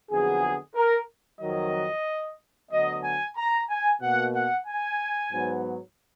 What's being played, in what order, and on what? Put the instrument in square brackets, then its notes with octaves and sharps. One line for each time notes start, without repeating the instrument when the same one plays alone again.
[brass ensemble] F2 D3 F#3 B3 G#4
A#4
F2 D#3 F#3 D#5
D2 D3 F#3 B3 D#5
G#5
A#5
G#5
B2 A#3 F#5
F#5
G#5
G#2 F#3 B3